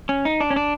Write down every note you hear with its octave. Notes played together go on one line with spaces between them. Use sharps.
C#4
D#4
D4
C#4
D4